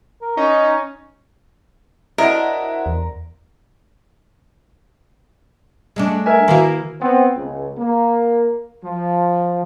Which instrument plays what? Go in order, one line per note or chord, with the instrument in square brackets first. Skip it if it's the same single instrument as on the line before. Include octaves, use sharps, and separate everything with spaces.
[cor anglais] A#4
[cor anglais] C#4 [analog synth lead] D#4
[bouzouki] D4 C5 D#5 [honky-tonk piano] E4 F#4 [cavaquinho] A#4
[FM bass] E2
[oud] G#3 A3 D4
[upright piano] A#4 E5 G#5
[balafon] D#3 F#4 [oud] A#3 E4 F5
[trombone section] B3 C4
C#2
A#3
F3